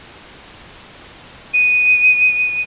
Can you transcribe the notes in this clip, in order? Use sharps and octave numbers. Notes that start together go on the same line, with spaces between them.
D#7